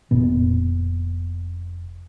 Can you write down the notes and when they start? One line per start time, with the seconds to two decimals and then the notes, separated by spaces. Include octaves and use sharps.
0.11 F1 A#2 B3